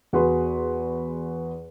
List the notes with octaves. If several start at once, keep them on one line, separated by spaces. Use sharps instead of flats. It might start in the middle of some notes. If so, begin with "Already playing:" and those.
E2 F#4 G#4 B4 C6